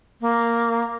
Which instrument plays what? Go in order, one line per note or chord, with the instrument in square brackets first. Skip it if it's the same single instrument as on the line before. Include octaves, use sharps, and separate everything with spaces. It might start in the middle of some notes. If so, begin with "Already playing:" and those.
[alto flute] A#3